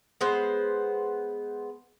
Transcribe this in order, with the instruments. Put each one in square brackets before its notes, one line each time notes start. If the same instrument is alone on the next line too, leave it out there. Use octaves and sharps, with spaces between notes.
[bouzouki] G#3 B3 C5